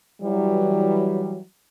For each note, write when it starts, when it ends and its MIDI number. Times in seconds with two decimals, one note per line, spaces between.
0.21 1.40 52
0.21 1.40 54
0.21 1.40 55